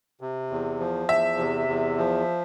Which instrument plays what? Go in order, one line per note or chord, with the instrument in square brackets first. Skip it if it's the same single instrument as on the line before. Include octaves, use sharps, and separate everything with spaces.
[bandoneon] C3
E2
F3
[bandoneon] E2 [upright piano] E5
[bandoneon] C3
E2
F3